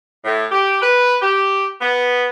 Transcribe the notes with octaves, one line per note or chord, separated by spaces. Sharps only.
A2
G4
B4
G4
B3